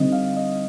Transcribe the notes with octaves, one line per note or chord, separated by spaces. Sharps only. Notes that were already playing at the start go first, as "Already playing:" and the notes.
Already playing: D3 G3 C4 D#4 D#5
F5
D#5